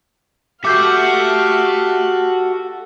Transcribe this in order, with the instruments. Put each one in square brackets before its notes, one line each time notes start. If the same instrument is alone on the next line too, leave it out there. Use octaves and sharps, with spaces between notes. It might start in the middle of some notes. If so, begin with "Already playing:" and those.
[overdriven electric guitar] F#4 [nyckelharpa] G4 F5 [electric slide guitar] A4 E5 [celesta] D6 G6 C7